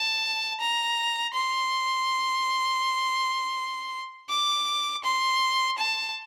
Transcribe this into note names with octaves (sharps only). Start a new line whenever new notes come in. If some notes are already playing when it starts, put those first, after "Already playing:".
Already playing: A5
A#5
C6
D6
C6
A5